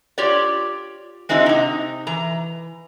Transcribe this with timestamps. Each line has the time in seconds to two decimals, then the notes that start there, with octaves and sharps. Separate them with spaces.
0.18 F4 G4 C#5 D5
1.29 G#3 C4 D#4 E4 F#4
1.46 C3 D#4
2.07 E3 A#5